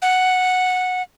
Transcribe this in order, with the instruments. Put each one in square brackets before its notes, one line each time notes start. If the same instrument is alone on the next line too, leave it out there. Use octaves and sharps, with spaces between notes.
[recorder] F#5